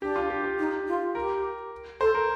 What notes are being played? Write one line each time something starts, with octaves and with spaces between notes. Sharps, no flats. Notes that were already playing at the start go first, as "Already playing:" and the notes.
D4 G4
F4
G4
G4
D#4
F4
G4 A#4
A4 C5
A#4